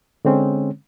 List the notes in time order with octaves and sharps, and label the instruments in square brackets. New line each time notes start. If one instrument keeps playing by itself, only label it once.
[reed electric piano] D3 G#3 C4 C#4